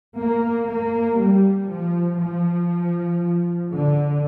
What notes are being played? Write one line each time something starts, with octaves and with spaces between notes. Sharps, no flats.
A#3
A#3
G3
F3
F3
D3